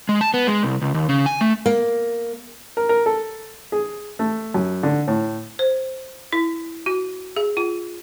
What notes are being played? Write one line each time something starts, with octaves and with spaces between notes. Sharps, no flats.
G#3
A5
B3
G#3
C2
C#2
D#2
C#3
G#5
A3
A#3
A#4
A#4
A4
G#4
A3
F#2
D3
A2
C5
E4
F#4
G#4
F4